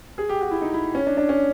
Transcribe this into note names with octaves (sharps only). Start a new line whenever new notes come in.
G#4
G4
F#4
E4
D#4
E4
C#4
D4
D4
C#4